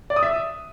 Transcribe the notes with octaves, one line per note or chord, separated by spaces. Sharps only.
D5
D#6
E5